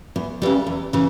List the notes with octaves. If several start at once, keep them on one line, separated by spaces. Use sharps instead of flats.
E2
C#3 E3 G3
E2
C#3 E3